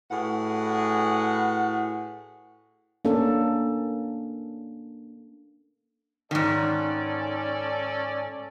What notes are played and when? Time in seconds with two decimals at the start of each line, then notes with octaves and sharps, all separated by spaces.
0.11 A2 F#4 G#4 B4 F#5
3.05 A#3 C#4 D4 A4
6.31 G#2 D#3 C#4 A4 D5